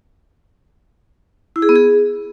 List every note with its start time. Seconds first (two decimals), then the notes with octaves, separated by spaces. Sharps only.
1.56 E4
1.62 G#4
1.69 B3
1.76 G#4